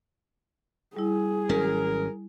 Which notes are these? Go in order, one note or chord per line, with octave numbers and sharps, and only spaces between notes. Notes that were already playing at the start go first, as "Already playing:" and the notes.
G3 E4 G#4
G#1 F#3 C#4 A#4